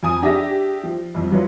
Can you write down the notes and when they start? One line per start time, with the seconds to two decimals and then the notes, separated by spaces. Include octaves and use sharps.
0.03 F2 G#5 D#6 D#7
0.22 D4 G4 G#4 E5 A#6
0.84 F3
1.14 C2 F2
1.32 F3 F#3 F4 B4 C#5